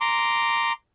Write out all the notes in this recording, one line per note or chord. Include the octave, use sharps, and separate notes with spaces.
A#5 C6 D6